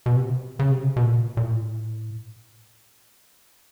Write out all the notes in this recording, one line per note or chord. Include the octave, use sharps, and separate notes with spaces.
B2
C3
C#3
C3
C#3
B2
A#2
A#2
A2